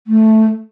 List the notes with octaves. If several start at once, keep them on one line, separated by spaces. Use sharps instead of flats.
A3